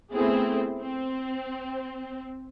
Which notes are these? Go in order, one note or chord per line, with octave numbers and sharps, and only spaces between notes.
A3 B3 C4 E4 G#4
C4